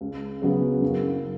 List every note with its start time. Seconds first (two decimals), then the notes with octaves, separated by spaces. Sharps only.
0.01 C#2
0.42 C#3 F#3 B3
0.82 F#1